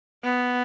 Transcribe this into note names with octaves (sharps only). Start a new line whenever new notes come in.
B3